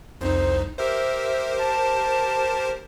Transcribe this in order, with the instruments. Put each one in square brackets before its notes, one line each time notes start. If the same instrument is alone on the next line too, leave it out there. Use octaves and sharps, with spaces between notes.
[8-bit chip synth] C2 F2 D#4 [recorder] C5
[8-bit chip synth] G4 A#4 C5 [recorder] E5
[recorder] A5